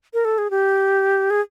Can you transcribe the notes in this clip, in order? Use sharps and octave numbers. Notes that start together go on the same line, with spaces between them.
A#4
A4
G#4
G4
G#4